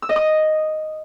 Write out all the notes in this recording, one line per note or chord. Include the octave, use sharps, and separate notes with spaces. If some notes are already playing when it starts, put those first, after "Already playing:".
E6
D#5
D#6